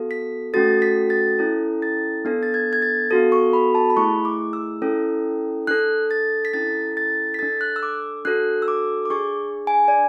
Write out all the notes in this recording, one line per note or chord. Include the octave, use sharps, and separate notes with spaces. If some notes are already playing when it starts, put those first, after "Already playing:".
Already playing: B3 F#4 A4
B6
A3 C#4 F#4 A4 A6
B6
A6
C#4 E4 A4
A6
B3 D4 A4
A6
G#6
G#6
A6
B3 F#4 A4
C#6
B5
A5
B5
A3 E4 G#4 C#6
D6
E6
C#4 E4 A4
D4 A4 F#6
A6
B6
C#4 E4 A4 A6
A6
B6
D4 A4 A6
F#6
E6
D6
D4 F#4 A4 F#6
E6
D6
D6
D4 G#4 C#6
G#5
D5